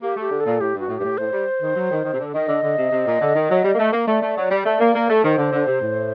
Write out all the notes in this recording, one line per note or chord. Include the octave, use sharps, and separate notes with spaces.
A#3 G4
A3 G4
D3
A4
A#2
A2 G4
G2
F#4
A2
G2 A2 G4
A2 C5
G3
D#3
F#3
D#3
D#3
C3
D3
D#3 D#5
D3
D3
C3
C3
A#2
D3
D#3
F#3
G3
A#3
A3
A#3
A3 D5
A3
F#3
G3
A3
A#3
A#3
A3
D#3 C5
D3
D3
C3
A2